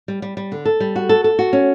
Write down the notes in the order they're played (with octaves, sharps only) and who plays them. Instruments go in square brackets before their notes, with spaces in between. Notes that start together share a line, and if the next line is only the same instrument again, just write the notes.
[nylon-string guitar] G3
G3
G3
D3
A4
G3
F#4
A4
A4
F#4
C#4